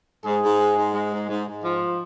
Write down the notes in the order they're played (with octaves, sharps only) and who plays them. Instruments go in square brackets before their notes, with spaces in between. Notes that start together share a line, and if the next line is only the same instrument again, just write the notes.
[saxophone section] G#2 [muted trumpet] G#4
[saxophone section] G#2
G#3
G#2
G#3
G#2
G#2
G#2
F3